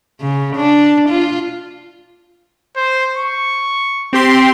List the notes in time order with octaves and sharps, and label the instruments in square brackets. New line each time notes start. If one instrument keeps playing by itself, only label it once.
[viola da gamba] C#3
D4
F4
[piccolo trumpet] C5
C#6
[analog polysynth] C4 G4 C6